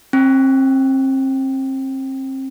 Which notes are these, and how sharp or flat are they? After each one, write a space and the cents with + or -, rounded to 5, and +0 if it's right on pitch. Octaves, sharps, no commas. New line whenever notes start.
C4 +35